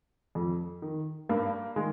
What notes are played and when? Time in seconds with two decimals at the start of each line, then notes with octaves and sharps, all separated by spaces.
0.35 F2
0.82 D#3
1.29 G2 A#3
1.76 D#3 G#3